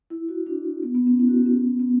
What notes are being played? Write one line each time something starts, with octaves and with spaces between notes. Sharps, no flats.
E4
F#4
D4
B3
B3
C#4
E4
F#4
G4
C#4
B3
B3